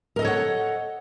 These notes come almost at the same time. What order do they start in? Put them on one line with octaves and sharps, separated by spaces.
A#4 D#5 A4 C#5 F#5